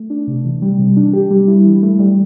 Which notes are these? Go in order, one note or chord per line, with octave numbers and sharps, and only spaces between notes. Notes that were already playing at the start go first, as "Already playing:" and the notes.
Already playing: A3
D4
C3
E3
G3
C3
D4
G4
G3
E4
E3
A3
G3